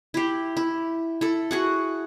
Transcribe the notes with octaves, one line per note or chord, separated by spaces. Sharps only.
E4 G4
E4
E4 A4
F#4 G#4 F#5